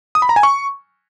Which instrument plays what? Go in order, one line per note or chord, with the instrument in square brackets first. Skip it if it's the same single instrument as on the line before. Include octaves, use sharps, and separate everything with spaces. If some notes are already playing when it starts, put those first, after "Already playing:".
[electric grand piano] D#6
B5
A#5
G#5
C#6